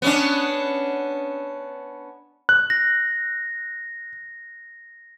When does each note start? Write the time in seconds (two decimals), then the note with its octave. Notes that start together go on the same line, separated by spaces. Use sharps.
0.02 B3 C#4 D4
2.49 F#6
2.70 A#6